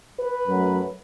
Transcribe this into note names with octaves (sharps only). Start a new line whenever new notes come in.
B4
F#2 F#3 A3